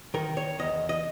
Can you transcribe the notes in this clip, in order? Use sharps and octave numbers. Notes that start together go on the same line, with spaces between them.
D#3 A#4
C#5
E2 D#5
D#5